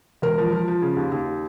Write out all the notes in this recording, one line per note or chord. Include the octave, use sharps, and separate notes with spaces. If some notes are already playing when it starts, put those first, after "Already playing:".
E1 A#4
F3
F3
F3
C#3
D#2
D#2